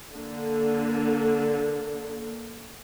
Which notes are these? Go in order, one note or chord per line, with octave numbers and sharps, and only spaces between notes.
D3 A#3